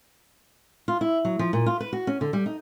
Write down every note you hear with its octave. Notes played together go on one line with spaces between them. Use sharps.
F4
E4
F#3
F3
A#2
F4
B4
F#4
C#4
D3
G3
D#4